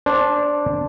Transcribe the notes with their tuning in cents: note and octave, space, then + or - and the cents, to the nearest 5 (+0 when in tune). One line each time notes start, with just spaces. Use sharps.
D4 -5 C5 +20